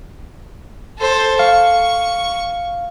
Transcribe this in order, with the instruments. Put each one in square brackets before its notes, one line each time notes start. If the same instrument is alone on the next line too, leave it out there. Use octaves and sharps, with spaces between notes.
[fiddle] A4 C5
[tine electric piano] F5 [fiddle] C#6